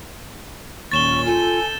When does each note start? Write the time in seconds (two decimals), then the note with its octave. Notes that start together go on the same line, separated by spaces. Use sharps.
0.92 D#2 A#2 C#4 C#6 A6 E7 G7
1.26 F4 A4 G#5 G6